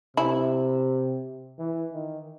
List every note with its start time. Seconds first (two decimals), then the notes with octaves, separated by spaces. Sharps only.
0.16 C3 E4
1.58 E3
1.93 D#3